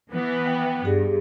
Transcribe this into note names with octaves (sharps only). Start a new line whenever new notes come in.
E3 B3
G5
G2 G4 G#4